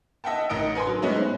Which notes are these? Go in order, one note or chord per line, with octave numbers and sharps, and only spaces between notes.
D#5 E5 F#5 G5 A5
A1 A#4 D#5 D#6 D7
A#4 B4 G#5 B5 C6
F#3
A2 G#3 B3 C#4 E4 F#4
C5